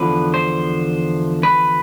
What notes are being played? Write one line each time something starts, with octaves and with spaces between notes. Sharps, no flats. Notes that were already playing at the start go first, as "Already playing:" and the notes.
Already playing: E2 D3 F3 B4
C5
B4